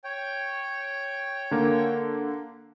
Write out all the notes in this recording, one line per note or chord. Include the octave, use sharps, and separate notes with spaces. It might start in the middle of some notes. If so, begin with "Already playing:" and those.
C#5 G5
D3 A#3